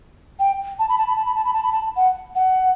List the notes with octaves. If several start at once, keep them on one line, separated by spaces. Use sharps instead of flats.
G5
A5
B5
A5
B5
A5
B5
A5
B5
A5
B5
A5
F#5
F#5